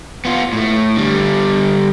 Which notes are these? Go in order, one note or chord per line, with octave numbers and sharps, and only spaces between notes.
B3 F4
A2 A3
D3 G3